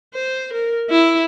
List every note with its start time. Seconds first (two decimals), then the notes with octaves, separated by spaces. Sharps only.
0.14 C5
0.53 A#4
0.90 E4